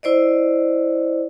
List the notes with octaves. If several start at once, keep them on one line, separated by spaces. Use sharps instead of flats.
E4 C5 D5 D#5